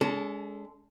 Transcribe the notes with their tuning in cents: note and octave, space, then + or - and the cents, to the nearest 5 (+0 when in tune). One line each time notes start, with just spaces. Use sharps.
G#3 +0 C#4 +45 A4 +0